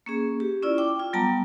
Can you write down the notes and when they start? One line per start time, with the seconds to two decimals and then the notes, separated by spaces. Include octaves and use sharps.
0.06 A#3 C#4 G#4
0.40 G4
0.63 C#4 E4 F4 D5 E6
0.78 G5 D6
1.00 F4
1.13 F#3 G3 B3 G5 A5 A#5